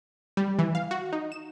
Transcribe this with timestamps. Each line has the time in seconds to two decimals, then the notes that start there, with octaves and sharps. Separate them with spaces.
0.37 G3
0.59 E3
0.75 F5
0.91 F#4
1.13 D#4
1.32 E7